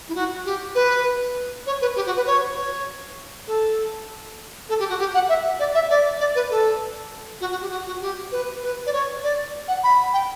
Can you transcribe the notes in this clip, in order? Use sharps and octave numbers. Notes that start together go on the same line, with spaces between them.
E4
F#4
G4
B4
C#5
B4
G4
F#4
B4
C#5
C#5
A4
A4
G4
F#4
G4
F#5
E5
D5
E5
D5
D5
B4
A4
F#4
F#4
G4
F#4
F#4
G4
B4
B4
D5
C#5
D5
F#5
B5
G5